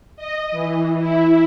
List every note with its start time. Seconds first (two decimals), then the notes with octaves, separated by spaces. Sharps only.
0.17 D#5
0.52 E3
1.00 E4